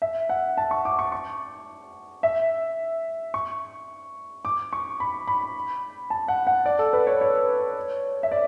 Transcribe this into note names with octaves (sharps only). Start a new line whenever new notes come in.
E5
F#5
A5
C#6
D6
C#6
C#6
E5
C#6
D6
C#6
B5
B5
A5
F#5
F#5
D5
A4
B4
C#5
C#5
E5
D5